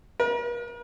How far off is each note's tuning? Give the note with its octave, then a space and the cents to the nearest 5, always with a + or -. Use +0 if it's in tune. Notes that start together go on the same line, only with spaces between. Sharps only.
A#4 +45